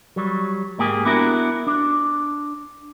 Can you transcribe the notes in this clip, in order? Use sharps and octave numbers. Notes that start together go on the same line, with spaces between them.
F#3 G3
G#2 A#3 G4 G#4
B3 D4 E4 F#4 A#4
D4